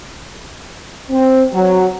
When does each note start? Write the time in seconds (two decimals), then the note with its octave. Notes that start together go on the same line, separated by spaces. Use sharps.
1.10 C4
1.53 F#3